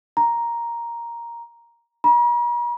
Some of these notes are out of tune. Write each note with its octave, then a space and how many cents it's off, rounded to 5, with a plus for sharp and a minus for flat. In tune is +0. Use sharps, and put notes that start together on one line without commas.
A#5 +5
A#5 +45